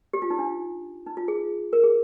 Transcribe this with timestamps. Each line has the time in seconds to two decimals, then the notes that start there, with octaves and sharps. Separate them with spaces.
0.13 G4
0.22 F4
0.30 D#4
0.39 D4
1.06 D#4
1.17 F4
1.28 G#4
1.73 A#4
1.83 G#4